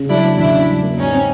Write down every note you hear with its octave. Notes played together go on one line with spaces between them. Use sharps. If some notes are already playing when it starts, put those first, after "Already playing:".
Already playing: C#3 C#4
F#3 D4 E4
A#3
C#3 D4 E4
C#4
F#3
A#3
G#2 C#4 D#4
C4